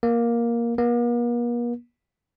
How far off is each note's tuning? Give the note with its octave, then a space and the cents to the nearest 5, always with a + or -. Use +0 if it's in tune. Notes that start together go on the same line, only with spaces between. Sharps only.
A#3 +10
A#3 +45